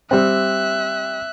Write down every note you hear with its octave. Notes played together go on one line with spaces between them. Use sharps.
G3 C4 E5 F#6